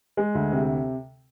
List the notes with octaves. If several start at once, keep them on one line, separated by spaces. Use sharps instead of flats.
G#3
D2
C3